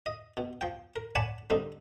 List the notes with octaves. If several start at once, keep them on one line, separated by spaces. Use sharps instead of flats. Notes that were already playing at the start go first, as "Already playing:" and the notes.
D#5
B2
F3 G5
A#4
C#5 D5 F#5 G#5 A5 B5
D3 G3 C4 D#4